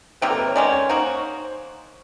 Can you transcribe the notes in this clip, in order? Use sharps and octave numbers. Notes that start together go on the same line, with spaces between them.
C3 D#3 F#3 A#3 B4
A4
B4
C#5
D#3 G#3 C#4 D5
C#5
A#3 D#4 F#4 C5